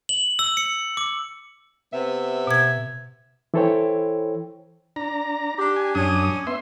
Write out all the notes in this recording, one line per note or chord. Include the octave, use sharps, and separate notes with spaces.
F#7
E6
C#7
D6
C3 B3 E5
B2 G#6
E3 E4 A4 C5 C#5 G5
D4 A#5
D4 G4
G#5
F#2 C#4 D4 D#6
B3 E5 C6